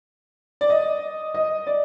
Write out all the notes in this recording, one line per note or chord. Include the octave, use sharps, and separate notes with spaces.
D5
D#5
D#5
D5